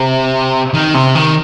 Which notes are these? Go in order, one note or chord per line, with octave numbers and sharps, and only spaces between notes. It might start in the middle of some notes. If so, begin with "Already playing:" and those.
Already playing: C3
D#3
C3
D#3